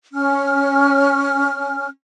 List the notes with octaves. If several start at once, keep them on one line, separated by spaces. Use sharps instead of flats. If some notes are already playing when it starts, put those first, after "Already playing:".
C#4 F6